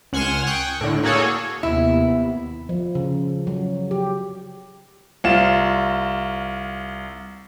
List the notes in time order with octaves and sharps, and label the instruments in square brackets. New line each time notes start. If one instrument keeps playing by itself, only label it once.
[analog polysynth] C#2 F#5 G#5 C6 F6 E7
G5 C#6 D#6 F#6
A2 D3
A#3 F#4 G#4 A4 C#5
[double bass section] D#2 C3 B3 [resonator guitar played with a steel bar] E4
[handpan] F3
C#3
F#3
G4
[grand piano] C2 F4 E7